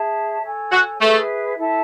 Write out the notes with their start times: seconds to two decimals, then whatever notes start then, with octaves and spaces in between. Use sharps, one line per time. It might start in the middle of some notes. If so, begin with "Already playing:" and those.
Already playing: G#4 C#5 E5 A5
0.43 A4 C#5 G#5
0.71 F#4
1.00 A3 G#4 B4 E5
1.57 E4 A4 E5 A5